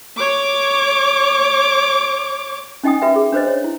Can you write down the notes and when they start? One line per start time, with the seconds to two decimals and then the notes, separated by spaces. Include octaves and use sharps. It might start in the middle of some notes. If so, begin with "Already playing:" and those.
0.16 C#5 D6
2.83 C#4 D#4 D#5 G5 G#5 D#6
3.02 F#4 B4 E5 G5
3.16 G#4
3.32 D4 B4 C5 D#5
3.48 C#5
3.64 E4